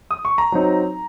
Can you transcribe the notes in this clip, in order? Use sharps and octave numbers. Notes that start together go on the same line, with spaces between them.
D#6
C#6
A#5
F#3 C4 D#4